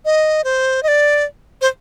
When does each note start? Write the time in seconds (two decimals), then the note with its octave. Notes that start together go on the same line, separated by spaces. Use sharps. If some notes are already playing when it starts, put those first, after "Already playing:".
0.05 D#5
0.44 C5
0.83 D#5
0.88 D5
1.61 C5